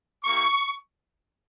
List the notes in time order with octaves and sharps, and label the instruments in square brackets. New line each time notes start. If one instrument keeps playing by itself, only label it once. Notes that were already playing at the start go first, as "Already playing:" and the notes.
[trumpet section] A#3 E4 G4 C#6